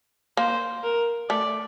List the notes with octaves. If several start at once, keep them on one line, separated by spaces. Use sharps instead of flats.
A#3 C5
A#4
A3 D5